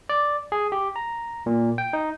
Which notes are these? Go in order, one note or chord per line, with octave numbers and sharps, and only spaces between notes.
D5
G#4
G4
A#5
A#2
G5
D#4